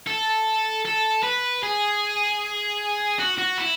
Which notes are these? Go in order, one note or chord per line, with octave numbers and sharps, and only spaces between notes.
A4
A4
B4
G#4
F#4
F#4
E4